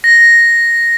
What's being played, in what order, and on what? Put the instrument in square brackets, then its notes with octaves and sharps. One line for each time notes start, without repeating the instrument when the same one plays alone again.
[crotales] A#6